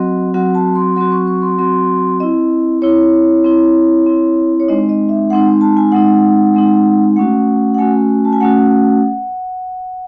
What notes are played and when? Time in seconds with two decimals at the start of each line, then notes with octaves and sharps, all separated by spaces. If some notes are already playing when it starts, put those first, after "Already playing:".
Already playing: F#3 C4 F#4 D#5
0.34 F#3 C4 F#4 F#5
0.55 A5
0.75 C6
0.96 F#3 C4 F#4 C6
1.12 C#6
1.27 C#6
1.42 C6
1.58 F#3 C4 F#4 C6
2.20 C4 E4 D#5
2.82 C4 E4 C#5
3.44 C4 E4
4.06 C4 E4
4.60 C#5
4.68 G#3 C4 D#4 D#5
4.89 D#5
5.09 E5
5.30 G#3 C4 D#4 F#5
5.61 A5
5.77 G#5
5.92 G#3 C4 D#4 F#5
6.54 G#3 C4 D#4
7.16 A3 C#4 F#4 F#5
7.74 F#5
7.78 A3 C#4 F#4 G#5
8.25 A5
8.33 G#5
8.40 A3 C#4 F#4 F#5